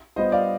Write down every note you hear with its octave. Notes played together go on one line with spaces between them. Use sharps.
G3 B3 F4 C5 D#5
D5 F5